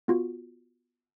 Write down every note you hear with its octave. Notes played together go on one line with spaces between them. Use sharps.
B3 F4 F#4